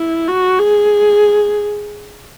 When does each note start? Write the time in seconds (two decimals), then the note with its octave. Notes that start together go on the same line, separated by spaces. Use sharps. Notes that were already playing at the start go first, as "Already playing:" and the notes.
Already playing: E4
0.28 F#4
0.59 G#4